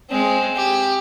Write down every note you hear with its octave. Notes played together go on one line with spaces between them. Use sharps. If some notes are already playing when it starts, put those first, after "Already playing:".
G#3 C4
G4